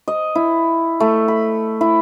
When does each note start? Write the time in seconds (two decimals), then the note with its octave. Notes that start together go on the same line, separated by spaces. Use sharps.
0.08 D#5
0.35 E4
1.00 A3
1.28 B5
1.81 E4